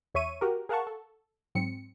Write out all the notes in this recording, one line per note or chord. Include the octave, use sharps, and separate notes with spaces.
E2 C#5 E5 C#6 D#7
F#4 G4 A#4
G#4 A#4 F5 F#5 A5 C#6
A4
G#2 F#3 C4 C#7